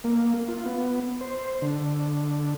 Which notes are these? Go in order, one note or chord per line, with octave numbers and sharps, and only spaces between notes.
A#3
F4
B3
C5
D3